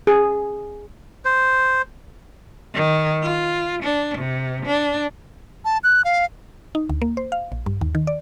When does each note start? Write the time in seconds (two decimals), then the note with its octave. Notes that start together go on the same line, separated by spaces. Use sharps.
0.07 G#4
1.25 C5
2.74 D#3
3.23 F4
3.83 D4
4.18 C3
4.65 D4
5.65 A5
5.84 F#6
6.05 F5
6.75 D#4
6.89 D2
7.02 A#3
7.17 C5
7.32 F5
7.52 A#1
7.66 G2
7.81 D#2
7.95 D#3
8.07 D5